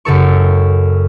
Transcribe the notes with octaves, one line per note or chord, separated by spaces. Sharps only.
F#2 C#3 A4 C#6